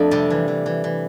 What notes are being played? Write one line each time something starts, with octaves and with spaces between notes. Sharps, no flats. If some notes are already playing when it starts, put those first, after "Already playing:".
Already playing: F2 A3 D4
C3 G3
E3
E3
E3
E3